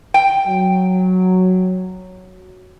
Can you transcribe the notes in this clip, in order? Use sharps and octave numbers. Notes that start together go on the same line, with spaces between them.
G5
F#3